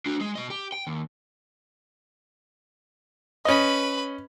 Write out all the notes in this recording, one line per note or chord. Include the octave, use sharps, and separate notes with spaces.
D4 F#4
G#3
B2 D#5
G4
G5
D#2
C#4 B4 D#5 B5